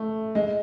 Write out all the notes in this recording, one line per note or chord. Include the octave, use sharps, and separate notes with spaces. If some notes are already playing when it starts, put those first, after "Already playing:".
Already playing: A3
G#3